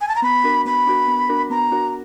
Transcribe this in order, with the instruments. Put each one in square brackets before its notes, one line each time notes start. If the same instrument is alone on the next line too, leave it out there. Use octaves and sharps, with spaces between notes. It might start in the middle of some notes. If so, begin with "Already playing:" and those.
[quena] G#5
A5
A#5
[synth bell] B3 [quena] B5
[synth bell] D4 F#4 A#4
[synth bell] B3 [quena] B5
[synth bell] D4 F#4 A#4
B3
D4 F#4 A#4
[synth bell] B3 [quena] A#5
[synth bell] D4 F#4 A#4